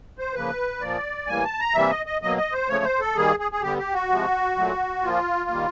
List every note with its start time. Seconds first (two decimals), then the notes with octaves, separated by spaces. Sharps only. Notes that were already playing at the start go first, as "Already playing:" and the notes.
0.18 C5
0.34 C#3 F3 A#3 B4
0.81 A#2 F3 A#3 D5
1.27 A2 E3 G3 A#3 G#5
1.44 A5
1.59 A#5
1.74 C3 E3 G3 A#3 E5
1.90 D#5
2.06 D#5
2.22 B2 F#3 A#3 D#5
2.37 D#5
2.52 C5
2.68 C#3 F3 A3 C#5
2.84 C5
3.00 A4
3.16 D#3 G3 A#3 G#4
3.39 G#4
3.52 G#4
3.62 D3 G3 B3 G4
3.78 G4
3.94 F#4
4.09 C3 F3 G#3
4.56 A#2 F#3 A3
5.03 A#2 F3 A#3 F4
5.50 D#3 G3 A#3